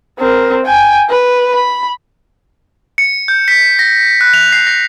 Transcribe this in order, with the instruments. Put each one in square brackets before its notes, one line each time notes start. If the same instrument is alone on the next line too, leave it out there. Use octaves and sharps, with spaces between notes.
[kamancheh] C4 A#4
G5 G#5
B4
B5
[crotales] C#7
G6
B6
A#6
F#6
F7
C7
A#6